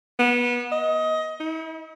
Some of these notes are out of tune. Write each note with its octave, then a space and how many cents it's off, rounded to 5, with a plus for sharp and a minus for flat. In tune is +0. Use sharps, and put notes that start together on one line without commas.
B3 -25
D#5 +20
E4 -45